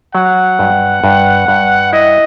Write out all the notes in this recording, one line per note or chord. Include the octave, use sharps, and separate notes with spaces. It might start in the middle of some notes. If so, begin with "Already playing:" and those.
F#3 F#5
G2
G2
G2
E4 D#5